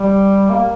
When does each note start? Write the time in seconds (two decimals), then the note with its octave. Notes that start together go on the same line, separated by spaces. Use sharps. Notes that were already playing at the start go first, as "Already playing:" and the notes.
Already playing: G3
0.50 A#3